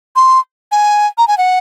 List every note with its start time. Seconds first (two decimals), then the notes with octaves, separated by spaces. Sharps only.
0.16 C6
0.72 G#5
1.18 A#5
1.27 G#5
1.38 F#5